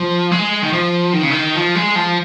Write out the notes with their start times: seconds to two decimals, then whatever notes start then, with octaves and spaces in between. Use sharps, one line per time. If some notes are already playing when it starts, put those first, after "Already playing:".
Already playing: F3
0.31 G#3
0.62 D#3
0.73 F3
1.13 D#3
1.23 C#3
1.31 D#3
1.55 F3
1.75 G#3
1.96 F3